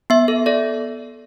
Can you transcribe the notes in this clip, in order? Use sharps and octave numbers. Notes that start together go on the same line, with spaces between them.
B3 E5
A4
A4 D5